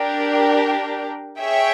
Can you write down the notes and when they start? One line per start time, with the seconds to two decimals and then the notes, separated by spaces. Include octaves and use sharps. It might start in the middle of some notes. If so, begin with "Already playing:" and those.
Already playing: D4 G4 A#4
1.39 G#4 C#5 E5 G5